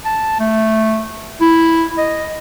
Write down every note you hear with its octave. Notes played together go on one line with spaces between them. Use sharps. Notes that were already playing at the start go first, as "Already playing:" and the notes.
A5
A3
E4
D#5